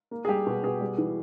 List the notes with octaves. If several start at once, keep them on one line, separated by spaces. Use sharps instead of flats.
A#3
G#4
G3 G4
B2
B2 G#4
G3
E3